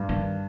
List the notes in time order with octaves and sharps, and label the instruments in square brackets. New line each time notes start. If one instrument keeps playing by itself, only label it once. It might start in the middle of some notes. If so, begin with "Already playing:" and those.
Already playing: [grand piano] G2 D4
[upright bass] D#3